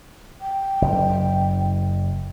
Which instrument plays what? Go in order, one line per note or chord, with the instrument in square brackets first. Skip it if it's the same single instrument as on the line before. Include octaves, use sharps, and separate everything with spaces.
[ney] G5
[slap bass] F#1